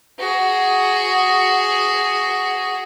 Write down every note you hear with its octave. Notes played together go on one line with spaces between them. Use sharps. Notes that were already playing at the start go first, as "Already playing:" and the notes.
F#4 G#4